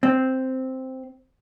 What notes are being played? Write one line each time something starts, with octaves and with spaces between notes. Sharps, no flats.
C4